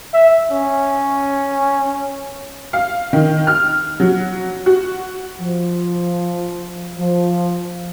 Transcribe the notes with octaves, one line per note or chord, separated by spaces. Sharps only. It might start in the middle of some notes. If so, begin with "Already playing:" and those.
E5
C#4
F5
D#3
F6
F#3
F#4
F3
F3